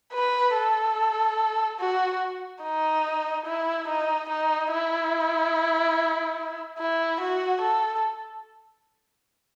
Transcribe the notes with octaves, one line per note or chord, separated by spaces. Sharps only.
B4
A4
F#4
D#4
E4
D#4
D#4
E4
E4
F#4
A4